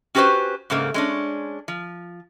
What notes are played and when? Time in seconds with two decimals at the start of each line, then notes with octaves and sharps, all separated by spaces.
0.15 C#4 F#4 G4 A4 B4 C5
0.70 G#2 C#3 A3 A#3
0.94 G#3 C#4 D4
1.68 F3